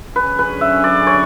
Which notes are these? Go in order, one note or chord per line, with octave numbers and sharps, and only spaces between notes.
D3 F#3 C#4 G#4 B4
B4
E5
D5
C#5